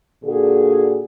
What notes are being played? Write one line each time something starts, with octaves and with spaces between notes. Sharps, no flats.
A#2 D3 F#4 G#4